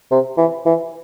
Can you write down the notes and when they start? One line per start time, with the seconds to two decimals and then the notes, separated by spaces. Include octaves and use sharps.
0.11 C3
0.37 E3
0.66 E3